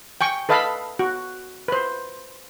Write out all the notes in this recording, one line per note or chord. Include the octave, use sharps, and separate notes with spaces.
G5 G#5 C#6
A4 B4 D#5 F5 A5 B5
F#4
B4 C5